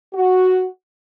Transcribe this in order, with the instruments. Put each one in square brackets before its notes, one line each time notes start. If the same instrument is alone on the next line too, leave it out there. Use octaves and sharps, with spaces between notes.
[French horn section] F#4